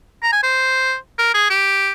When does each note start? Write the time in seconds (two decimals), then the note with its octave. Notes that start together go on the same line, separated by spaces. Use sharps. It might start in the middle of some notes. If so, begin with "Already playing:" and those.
0.22 A#5
0.32 G#5
0.43 C5
1.18 A#4
1.34 G#4
1.50 G4